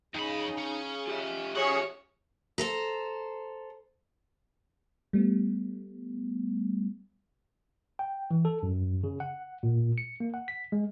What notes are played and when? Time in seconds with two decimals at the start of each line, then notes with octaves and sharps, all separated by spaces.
0.15 F2 C#3 D#4 B5
0.58 C#4
1.07 F4 G4 E5
1.55 C#4 F#4 G#4 C#5
2.58 A4 C5 A#5
5.13 G3 A3 B3
7.99 G5
8.31 E3
8.45 A4
8.63 F#2
9.04 C#3
9.20 F#5
9.63 A#2
9.98 C#7
10.20 A#3
10.34 F#5
10.48 B6
10.72 G#3